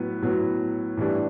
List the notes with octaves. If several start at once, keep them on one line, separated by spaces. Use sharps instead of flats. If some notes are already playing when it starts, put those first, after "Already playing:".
Already playing: A2 F#3 B3
A2 F#3 B3
A2 E3 G3 D4